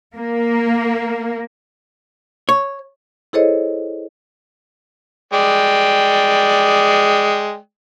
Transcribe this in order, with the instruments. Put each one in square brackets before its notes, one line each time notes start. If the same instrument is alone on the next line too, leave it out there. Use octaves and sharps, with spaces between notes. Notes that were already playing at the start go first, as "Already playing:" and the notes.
[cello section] A#3
[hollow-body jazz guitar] C#5
[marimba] E4 G#4 A4 C5 C#5 D#5
[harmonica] G#3 D5 G5